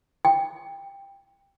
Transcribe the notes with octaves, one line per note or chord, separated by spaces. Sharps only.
G5